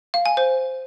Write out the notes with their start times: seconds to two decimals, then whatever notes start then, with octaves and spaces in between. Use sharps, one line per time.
0.14 F5
0.26 G#5
0.37 C5